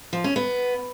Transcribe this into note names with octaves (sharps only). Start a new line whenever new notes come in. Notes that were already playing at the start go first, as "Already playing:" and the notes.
F3
C#4
B3